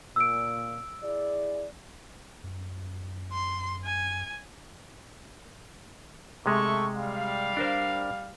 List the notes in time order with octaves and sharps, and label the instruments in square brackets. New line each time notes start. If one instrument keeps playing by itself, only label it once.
[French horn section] A#2 [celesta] E6 D7
[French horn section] E4 G#4 D5
[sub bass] F#2
[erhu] C6
G#5
[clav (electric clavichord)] C3 G#3 [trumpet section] A3 C#6
[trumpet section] G3 F5
[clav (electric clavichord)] D4 A#4 C5